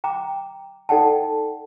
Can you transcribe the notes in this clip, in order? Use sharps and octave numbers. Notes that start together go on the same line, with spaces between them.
G5 A#5 D6
D#4 A4 D5 F#5 G5 A5